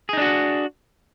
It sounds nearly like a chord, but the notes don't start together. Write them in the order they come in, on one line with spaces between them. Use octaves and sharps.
G#4 D#4 D4 F#4